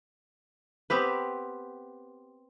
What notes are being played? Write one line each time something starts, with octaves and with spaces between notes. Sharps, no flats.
B3 C4 G4 B4